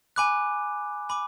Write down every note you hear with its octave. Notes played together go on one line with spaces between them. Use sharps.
G#5 B5 D6 F#6
G#5 B5 D6